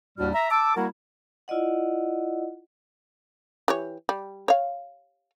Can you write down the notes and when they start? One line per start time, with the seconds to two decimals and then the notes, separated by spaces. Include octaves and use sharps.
0.18 D#2 A2 G3 D4 F#4 F6
0.34 E5 A#5
0.51 A5 D6 E6
0.77 G3 A#3 E4 F#4 A#4 F#5
1.48 E4 F4 D5 D#5 F#5
3.68 E3 G4 C#5
4.09 G3
4.48 C#5 F5